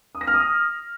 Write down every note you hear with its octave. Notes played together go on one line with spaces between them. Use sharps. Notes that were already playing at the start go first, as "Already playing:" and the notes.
D#6
A#6
F6
D#6